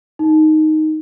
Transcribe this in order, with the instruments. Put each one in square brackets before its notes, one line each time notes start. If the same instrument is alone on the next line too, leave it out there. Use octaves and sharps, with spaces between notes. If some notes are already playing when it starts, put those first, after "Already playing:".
[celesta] D#4